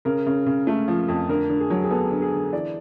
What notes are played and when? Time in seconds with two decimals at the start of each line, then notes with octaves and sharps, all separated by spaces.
0.05 C#3 A#4
0.26 C#3
0.46 C#3
0.67 A3
0.88 F3
1.08 F2
1.29 D3 A#4
1.50 D3
1.60 G#4
1.70 F#3
1.84 G#4
1.91 B3 A4
2.11 D3
2.22 G#4
2.33 D3
2.53 E3 D5